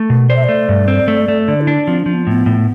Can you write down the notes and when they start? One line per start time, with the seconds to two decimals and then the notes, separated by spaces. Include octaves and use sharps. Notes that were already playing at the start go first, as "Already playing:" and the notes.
Already playing: A3
0.10 B2
0.29 C5 D5
0.36 E5
0.44 A3 D5
0.69 G2
0.88 C4
1.08 A3
1.28 A3
1.48 D3 D5
1.61 E4
1.67 D4
1.87 F3 C4
2.00 D4
2.06 F3
2.13 B3
2.27 A2 B3
2.46 A2